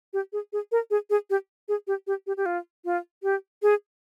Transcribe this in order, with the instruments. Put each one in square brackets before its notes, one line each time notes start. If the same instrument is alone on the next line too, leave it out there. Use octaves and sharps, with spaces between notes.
[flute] G4
G#4
G#4
A#4
G#4
G#4
G4
G#4
G4
G4
G4
G4
F4
F4
G4
G#4